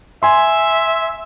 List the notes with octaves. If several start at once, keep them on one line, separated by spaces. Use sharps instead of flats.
E5 G#5 C6